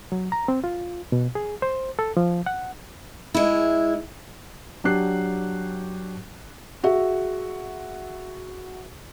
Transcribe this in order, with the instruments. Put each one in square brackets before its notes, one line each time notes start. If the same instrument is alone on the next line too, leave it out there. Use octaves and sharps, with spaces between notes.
[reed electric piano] F#3
A#5
C4
F4
B2
G#4
C5
A4
F3
F#5
[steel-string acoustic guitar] G#3 E4
[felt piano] F#3 D4 G4 F#6 C7
F#4 G#4 E5